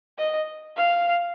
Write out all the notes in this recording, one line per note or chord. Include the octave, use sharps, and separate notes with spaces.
D#5
F5